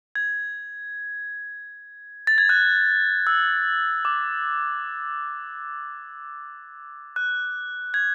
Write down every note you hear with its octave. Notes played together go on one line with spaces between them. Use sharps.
G#6
A6
G#6
F#6
E6
D6
F#6
G#6